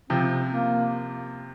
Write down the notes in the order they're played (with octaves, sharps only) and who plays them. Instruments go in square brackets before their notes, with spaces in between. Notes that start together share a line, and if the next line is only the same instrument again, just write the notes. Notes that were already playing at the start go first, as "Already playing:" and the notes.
[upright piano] C3 F3 [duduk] C4
[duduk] A#3